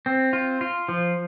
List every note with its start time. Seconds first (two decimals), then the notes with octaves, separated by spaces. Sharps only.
0.06 C4
0.33 F4
0.61 F4
0.89 F3